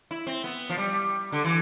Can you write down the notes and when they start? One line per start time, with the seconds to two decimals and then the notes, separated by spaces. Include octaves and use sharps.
0.11 E4
0.27 C4
0.44 B3
0.70 F3
0.78 G3
1.32 D3
1.45 E3